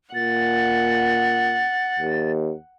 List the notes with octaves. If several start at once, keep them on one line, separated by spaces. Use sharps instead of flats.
A#2 F#5 A6
D#2